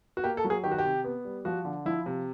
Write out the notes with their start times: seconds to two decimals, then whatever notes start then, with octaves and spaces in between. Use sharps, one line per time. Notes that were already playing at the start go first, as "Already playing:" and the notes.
0.17 F#4
0.24 A#3 G4
0.37 A4
0.45 F#3
0.50 G#4
0.64 D#3 G4
0.71 F#4
0.78 G4
0.84 C3
1.04 B3
1.25 G3
1.45 F3 F#4
1.65 D3
1.85 F3 E4
2.06 C3